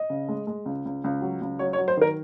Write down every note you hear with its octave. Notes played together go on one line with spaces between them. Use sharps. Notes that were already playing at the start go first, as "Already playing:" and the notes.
Already playing: D#5
C#3
G#3
G#3
C#2
C#2
C#2
F#3
C#2
F#3 C#5
C#5
F#3
C5
D#3 A#4